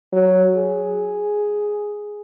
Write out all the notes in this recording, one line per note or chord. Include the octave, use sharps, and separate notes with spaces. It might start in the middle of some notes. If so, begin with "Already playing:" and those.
F#3
G#4